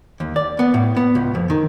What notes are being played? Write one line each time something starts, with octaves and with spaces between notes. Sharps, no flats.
D#2
D5
B3
A2
B3
C#2
F2
D#3